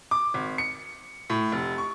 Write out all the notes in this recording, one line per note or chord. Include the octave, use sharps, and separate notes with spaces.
D6
G#1
C#7
A2
F1
C#6